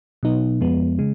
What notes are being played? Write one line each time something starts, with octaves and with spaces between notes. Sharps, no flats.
B2 F#3 B3 D#4
F2 F3 G#3 B3
C#3 G#3